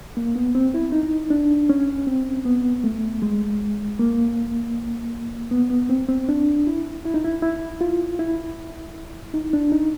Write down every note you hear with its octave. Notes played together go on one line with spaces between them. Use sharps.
A#3
B3
C4
E4
D#4
D4
C#4
C4
B3
A3
G#3
A#3
B3
B3
C4
C4
D4
E4
E4
D#4
E4
E4
F4
E4
D#4
D4
D#4